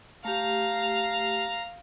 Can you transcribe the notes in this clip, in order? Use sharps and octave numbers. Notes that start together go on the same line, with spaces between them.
A3 G4 F5 A#5